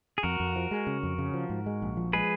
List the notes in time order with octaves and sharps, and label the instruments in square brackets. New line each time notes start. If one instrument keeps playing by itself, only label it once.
[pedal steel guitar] G#4
[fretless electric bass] F2 [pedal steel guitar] F#4 A#4
[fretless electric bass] F2
F3
G#3
C#3
F2
C#3
F3
G#2
G#3
A#1
F3
[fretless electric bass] G#3 [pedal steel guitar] G#4 B4